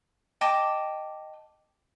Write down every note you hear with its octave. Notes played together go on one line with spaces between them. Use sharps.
D#5 G5 A5 D6